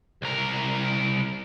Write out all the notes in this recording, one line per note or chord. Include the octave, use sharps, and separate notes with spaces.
C2 A#4